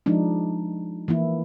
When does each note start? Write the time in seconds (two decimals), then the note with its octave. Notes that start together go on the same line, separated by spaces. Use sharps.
0.06 F3 G#3 D4 D#4
1.08 E3 A#3 E4